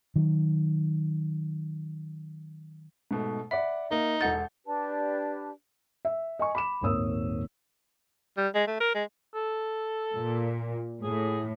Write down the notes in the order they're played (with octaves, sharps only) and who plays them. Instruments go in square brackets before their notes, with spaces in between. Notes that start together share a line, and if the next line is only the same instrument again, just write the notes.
[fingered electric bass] D#3 F#3
[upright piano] G#2 B2 A3
[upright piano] D5 F#5 B5 [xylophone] E5
[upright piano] A#3 [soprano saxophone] D#4
[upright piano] E1 A4 G6 [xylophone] F#5 A6
[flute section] D4 G4 B4 A5
[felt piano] E5
D#5 G#5 C#6
B5 D6 E7
D#1 G#1 A#3 C#5 D#6 E6
[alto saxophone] G3
G#3
A3
A#4
G#3
[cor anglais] A4
[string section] A#2
[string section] A2 [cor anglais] G#4